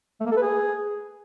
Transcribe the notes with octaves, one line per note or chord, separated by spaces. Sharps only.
A3
A#3
A4
B4
G#4